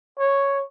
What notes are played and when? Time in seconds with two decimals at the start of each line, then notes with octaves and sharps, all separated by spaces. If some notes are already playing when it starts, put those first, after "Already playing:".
0.19 C#5